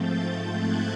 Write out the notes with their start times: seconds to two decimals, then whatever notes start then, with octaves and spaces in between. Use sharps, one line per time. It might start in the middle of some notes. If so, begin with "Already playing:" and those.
Already playing: G#2 F3 A3 C4 G6 A6
0.58 F#6 G#6